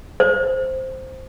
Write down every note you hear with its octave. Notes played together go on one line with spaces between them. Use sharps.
C5